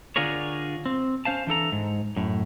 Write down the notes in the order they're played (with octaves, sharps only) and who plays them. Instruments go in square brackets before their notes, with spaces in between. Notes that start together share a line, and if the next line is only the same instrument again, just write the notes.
[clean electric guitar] D3 D4 F4 G#4 A#4 C#5
C4
C#4 C5 F5 A5
E3 D4 A4 A#5
G#2
F#2 A2